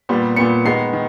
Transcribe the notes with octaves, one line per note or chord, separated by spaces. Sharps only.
A#2 G3 B3
A#2 G3 B3 C#7
D#3 G#3 B3 C7
D#3